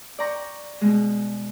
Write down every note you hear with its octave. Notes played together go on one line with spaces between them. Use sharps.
D5 G5 A#5 C#6
B2 G#3